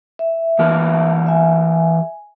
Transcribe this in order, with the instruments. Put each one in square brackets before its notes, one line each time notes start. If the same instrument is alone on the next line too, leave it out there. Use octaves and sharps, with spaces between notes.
[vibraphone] E5
[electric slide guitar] E3 G4 A#4
[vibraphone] E5 G#5